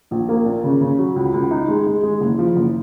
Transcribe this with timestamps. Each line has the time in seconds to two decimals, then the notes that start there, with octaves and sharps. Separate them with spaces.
0.11 A#1
0.29 A#3
0.45 A#2
0.63 C#3
0.81 C#3
0.98 F#3
1.16 C#2
1.34 C#2
1.51 D#4
1.68 G#3
1.86 G#3
2.03 G#3
2.20 F#1
2.39 F3
2.55 F#1